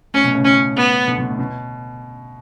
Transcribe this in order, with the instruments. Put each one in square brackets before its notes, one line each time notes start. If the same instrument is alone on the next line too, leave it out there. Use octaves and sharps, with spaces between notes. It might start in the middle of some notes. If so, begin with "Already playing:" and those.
[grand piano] A2 [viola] C#4
[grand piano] B2
A2 C#3
[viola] C#4
B3
[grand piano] B2 D3
B2
A2
B2